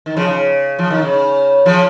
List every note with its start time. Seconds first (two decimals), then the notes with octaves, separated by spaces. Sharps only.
0.06 D#3
0.17 C#3 F3
0.27 C#3
0.79 F3
0.91 D#3
1.02 C#3
1.66 C#3 F3